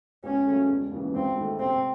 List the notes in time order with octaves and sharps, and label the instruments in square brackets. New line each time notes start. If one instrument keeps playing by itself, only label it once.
[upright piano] C#2 [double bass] C#4
[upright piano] C#3 F#3 A3
E1
D#2 C#3 E3
[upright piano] G#1 [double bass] C4
[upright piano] G#2 D#3 A3
[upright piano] C3 [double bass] C4